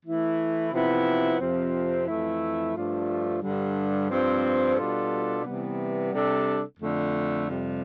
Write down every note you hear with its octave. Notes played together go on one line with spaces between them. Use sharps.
E3 A3 E4
C3 F3 B3 E4
F2 C3 F3 C4
F2 E3 A3 E4
G2 F3 A3 D4 F4
G2 D3 G3
G2 F3 C4
B2 G3 D4 F4 A4
C3 E3 G3 B3
C3 G3 D4 A4
F2 D3 A3
F2 C3 G3